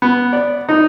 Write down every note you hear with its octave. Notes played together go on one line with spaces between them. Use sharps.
B3
D5
D#4